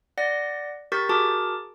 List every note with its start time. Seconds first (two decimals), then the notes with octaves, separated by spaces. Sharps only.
0.18 D5 F#5 A#6
0.92 G4 A#4 C#6 G6 A6 B6
1.09 F#4 G#4 A#4 A5 D6